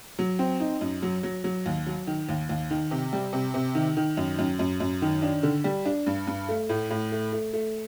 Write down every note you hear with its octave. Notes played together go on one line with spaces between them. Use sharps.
F#3
C4
D#4
F#2
F#3
F#3
F#3
D#2
F#3
D#3
D#2
D#2
D#3
C3
G3
C3
C3
D#3
D#3
F#2
F#2
F#2
F#2
D#3
D4
D3
G3
D4
G2
G2
A3
A2
A2
A3
A3
A3